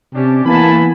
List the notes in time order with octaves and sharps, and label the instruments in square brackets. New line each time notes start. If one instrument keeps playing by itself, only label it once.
[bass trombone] C3 [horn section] C#4 D4 G4
[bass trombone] E3 [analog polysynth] A#3 B3 A5 [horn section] G#5 B5